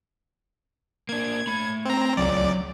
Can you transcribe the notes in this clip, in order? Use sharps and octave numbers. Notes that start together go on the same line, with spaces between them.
A#3 D4 G#6
A3 B5
C4 A#5
C#2 F#3 D5